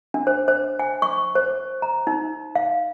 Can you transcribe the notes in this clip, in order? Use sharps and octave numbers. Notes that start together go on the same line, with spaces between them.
D4
C5
C5
G#5
C#6
C5
A#5
D#4
F5